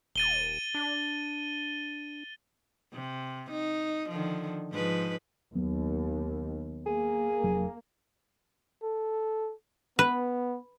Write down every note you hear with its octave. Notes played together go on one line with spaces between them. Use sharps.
D#1 A6 D#7 G7
D4
C3
D#4
D3 D#3 F3
G#2 F3 B4
D#2 F#3 B3
A#3 G#4
F1 F#3 D4
A4
B3 B4